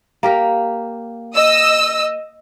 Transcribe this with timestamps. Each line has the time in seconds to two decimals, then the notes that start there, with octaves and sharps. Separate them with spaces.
0.23 A#3 G4 A#4
1.35 D#5 E6